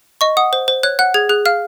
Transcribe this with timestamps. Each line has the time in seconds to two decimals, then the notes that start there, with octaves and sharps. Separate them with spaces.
0.21 D#5 C#6
0.37 F#5 D#6
0.53 C5
0.68 C5
0.83 C#5 F#6
0.99 F#5 F#6
1.14 G#4 G#6
1.29 G#4 F#6
1.46 F5 F6